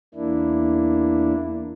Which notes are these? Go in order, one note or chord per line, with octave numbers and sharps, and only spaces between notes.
E2 A#3 D4 E4